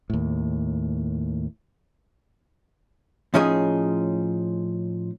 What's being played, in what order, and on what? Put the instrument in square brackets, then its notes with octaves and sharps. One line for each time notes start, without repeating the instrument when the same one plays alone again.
[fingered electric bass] D#2 A2
[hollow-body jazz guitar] A2 F3 C#4 D#4 G#4